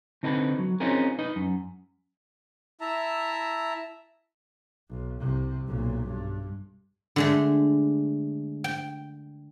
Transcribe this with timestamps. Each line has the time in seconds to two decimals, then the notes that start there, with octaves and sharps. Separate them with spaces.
0.23 D3 C4 D#4 E4 A4 B4
0.59 F#3
0.80 C4 C#4 D#4 F4 G#4 A#4
1.19 D#4 B4 D#5
1.36 F#2
2.81 E4 E5 A5 A#5
4.90 B1
5.20 C2 C3
5.66 B1 A#2
6.05 G2
7.16 D3 G#3 A3
8.64 G5